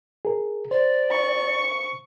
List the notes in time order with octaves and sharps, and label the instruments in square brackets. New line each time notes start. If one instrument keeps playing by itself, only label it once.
[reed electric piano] G#4 A#4
[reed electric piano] C5 [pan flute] D5
[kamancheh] C#6